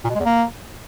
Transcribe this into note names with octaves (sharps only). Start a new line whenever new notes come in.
A#2
B2
G#3
E2
A#3